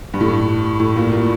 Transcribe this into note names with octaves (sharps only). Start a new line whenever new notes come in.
G2
A2
G2
A2
A#2
A#2